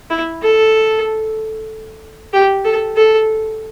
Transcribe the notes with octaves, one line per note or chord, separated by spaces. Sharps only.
E4
A4
G4
A4
A4